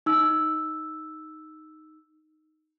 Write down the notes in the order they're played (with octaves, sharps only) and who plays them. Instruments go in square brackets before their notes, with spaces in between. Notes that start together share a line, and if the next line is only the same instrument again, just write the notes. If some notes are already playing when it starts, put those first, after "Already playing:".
[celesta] D#4 E6